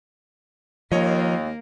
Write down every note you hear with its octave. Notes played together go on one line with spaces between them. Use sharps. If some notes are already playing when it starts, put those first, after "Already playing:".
D#2 F3 A#3 C#5 D#5